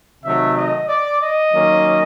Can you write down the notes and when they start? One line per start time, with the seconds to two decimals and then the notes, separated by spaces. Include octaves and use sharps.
0.23 C3 D#3 F#3 A3 E5
0.57 D#5
0.89 D5
1.21 D#5
1.53 D#3 F#3 A#3 C#4